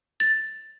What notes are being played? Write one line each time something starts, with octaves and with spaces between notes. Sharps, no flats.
A6